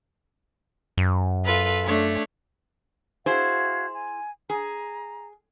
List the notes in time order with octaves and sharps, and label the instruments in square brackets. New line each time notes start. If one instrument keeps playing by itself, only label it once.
[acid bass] F#2
[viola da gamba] F4 A4 B4
A3 D4 C#5
[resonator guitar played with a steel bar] E4 G#4 C5 [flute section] F#4 F5 G#6
[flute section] G#5
[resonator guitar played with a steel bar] G#4 [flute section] A#5